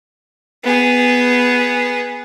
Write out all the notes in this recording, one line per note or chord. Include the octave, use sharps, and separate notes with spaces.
B3 G#4